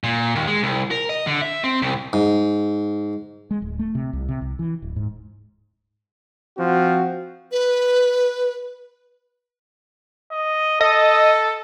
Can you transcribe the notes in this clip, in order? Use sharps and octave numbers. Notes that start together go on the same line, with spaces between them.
A#2
D#2
G#3
C2
A#4
D#5
D3
E5
C4
C2
G#2
G#3
D1
A3
C3
C2
C3
C2
E3
D1
G#2
F3 C4 F#4
B4
D#5
A4 D#5